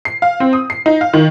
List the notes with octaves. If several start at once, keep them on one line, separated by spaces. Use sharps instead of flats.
C7
F5
C4
D#6
C7
D#4
F5
D#3